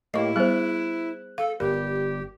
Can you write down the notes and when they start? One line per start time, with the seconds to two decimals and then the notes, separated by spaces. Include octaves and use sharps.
0.14 A2 A#3 E4 G4 D#5 C#6
0.36 G3 B3 G#4 C5 F#6
1.38 A4 F5
1.60 G1 G3 G4 A#4